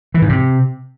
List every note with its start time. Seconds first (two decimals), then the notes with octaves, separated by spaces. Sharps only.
0.14 E3
0.22 G#2
0.29 C3